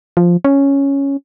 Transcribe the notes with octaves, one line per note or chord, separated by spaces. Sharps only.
F3
C#4